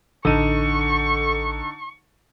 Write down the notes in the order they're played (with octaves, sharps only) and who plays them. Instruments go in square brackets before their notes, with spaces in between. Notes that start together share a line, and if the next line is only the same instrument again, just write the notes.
[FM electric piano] A1 A4 [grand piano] D3 D#4 D#7 [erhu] C#6